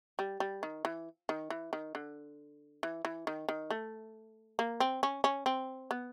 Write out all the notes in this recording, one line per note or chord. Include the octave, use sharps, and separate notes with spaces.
G3
G3
D#3
E3
D#3
E3
D#3
D3
E3
E3
D#3
D#3
A3
A#3
C4
C#4
C#4
C4
B3